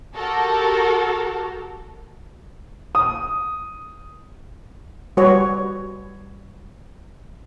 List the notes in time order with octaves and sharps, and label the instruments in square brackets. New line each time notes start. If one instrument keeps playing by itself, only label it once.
[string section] F#4 G4 A4 A#4
[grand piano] D#6
[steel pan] G3 F#4 B4 C#5